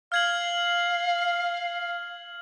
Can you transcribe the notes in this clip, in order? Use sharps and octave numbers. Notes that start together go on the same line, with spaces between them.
F5 F6 G#6 F#7